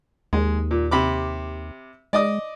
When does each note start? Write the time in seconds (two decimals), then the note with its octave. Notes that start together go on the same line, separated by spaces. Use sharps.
0.33 D#2 G#3
0.71 A#2
0.91 C3 B5 D6
2.13 G#3 D5 D#5 D#6